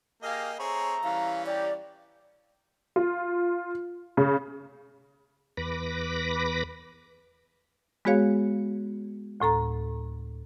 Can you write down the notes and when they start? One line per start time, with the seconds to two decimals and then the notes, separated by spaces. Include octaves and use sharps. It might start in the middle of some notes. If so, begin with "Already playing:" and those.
0.23 A#3 G4 G#4 D#5 F5
0.59 A3 C4 G#4 C#5 A#5
1.04 E3 G3 C#4 F5
1.46 G4 D5 G5 A#5
2.96 F4
4.17 C#3
5.57 E2 B4 B5 D6 A#6
8.05 G#3 B3 F#4 G#4 C#5 F5
9.40 D2 A2 A4 A#5